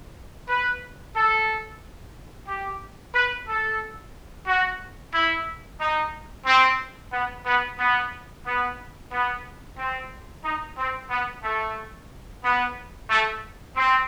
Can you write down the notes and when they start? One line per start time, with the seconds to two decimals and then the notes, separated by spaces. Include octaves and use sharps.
0.49 B4
1.15 A4
2.48 G4
3.14 B4
3.48 A4
4.47 F#4
5.13 E4
5.80 D#4
6.46 C4
7.13 B3
7.46 B3
7.79 B3
8.46 B3
9.12 B3
9.78 C4
10.44 D#4
10.78 C4
11.11 B3
11.44 A3
12.44 B3
13.10 A3
13.77 C4